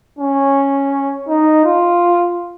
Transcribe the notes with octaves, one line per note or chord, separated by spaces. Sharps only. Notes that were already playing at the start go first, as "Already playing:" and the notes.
C#4
D#4
F4